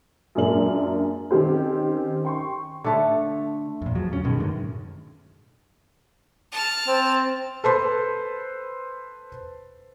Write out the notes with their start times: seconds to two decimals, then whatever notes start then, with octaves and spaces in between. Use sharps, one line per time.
0.35 F#2 A#2 G#3 D4 A#4 F#7
1.31 D#3 C4 C#4 G4 C5
2.25 G5 C6 C#6
2.84 D3 A3 C#5
3.82 F2 A#2
3.95 E2 F3 F#3
4.12 D2 C#4
4.24 F#2 B2 D#3 G#3
4.38 F#2 A2 D3 D#3
6.52 A5 F6
6.87 C4
7.64 A4 B4 C5 B5 C6